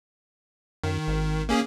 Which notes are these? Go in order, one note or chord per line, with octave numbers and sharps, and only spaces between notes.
F#2 D#3
G#1
A#3 C#4 G#4